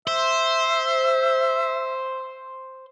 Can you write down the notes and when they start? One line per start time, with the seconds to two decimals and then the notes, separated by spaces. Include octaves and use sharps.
0.07 C5 E5